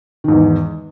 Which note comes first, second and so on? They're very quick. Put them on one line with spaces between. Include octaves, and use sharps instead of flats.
D#3 G#2 E2